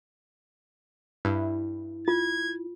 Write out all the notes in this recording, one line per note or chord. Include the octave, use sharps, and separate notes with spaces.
G2 E4
F4 G#6